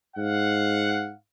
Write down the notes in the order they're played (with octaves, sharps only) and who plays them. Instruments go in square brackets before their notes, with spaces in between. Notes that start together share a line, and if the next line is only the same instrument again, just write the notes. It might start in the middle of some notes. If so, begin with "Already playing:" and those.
[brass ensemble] G#2 F5 F#5